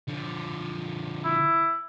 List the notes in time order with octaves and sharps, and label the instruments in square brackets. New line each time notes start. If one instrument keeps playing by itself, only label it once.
[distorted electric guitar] D3 F3
[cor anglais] E4